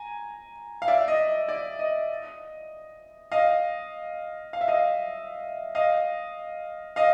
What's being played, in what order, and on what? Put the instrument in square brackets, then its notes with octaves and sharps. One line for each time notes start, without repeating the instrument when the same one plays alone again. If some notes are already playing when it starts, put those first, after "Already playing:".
Already playing: [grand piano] G#5 A#5
F5
D5 E5
D#5
D#5
D5
D#5
D#5 F5
F5
E5
D#5 F5
D#5 F5
D#5 F5